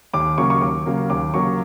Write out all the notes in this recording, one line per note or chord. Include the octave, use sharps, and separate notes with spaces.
D#2 D6
C#3 F#3 A#3 C#6
C#6
D#2 D6
C#3 F#3 A#3
D#2 D6
C#3 F#3 A#3 C#6